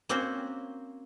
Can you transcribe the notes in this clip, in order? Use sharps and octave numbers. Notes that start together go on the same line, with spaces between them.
A#3 C4 C#4 F#4 C5